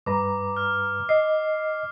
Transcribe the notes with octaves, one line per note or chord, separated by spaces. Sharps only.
G2 B4 A#5 D6
F6
D#5 C7